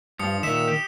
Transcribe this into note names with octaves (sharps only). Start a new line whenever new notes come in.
G2 F3 D#6 C#7
A#2 D#3 E5 E7
G4